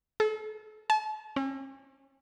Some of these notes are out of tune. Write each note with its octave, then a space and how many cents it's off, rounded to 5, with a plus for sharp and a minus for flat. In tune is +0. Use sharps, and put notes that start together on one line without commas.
A4 -40
A5 -40
C#4 -45